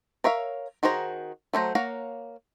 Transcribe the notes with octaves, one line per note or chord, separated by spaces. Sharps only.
A#4 C#5 E5 F5
D#3 F#4 G#4 C5 A#5
F#3 A3 C5 A#5
A#3 C#5 F5 F#5 A#5